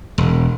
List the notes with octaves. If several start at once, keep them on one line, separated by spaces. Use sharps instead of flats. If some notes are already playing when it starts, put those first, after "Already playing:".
E1